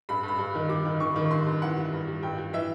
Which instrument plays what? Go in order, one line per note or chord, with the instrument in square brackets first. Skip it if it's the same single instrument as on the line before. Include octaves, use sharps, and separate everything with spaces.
[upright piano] G2 B5
G2 B5
G2
D#3
G3 D6
D#3
D#3 C#6
D#3 C#6
G2 C6
G2
E3 F#5
G3
G2
G3
G2 G5
G3
E3 E5